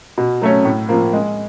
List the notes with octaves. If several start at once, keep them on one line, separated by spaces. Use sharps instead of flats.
B2
F#3 A3 C#4
A2
F3 A#3
G#3